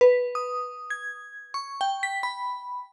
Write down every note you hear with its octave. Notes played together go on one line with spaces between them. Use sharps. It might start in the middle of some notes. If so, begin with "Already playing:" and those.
B4
D#6
G#6
C#6
G5
B6
B5